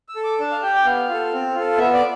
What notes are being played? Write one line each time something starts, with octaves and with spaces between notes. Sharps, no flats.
E6
A4
D6
D4 A5
F5
G4 G5
G5
B3 F5
F4 A4
C4
F4 A4
B3 E5
D5